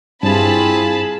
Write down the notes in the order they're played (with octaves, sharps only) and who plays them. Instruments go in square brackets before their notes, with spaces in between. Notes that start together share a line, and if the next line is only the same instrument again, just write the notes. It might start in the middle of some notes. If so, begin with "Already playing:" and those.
[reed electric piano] G2 [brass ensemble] C4 E4 F4 [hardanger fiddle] G#4 [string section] A5 B5